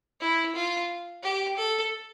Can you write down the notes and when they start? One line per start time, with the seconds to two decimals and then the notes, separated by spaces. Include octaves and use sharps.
0.21 E4
0.55 F4
1.23 G4
1.57 A4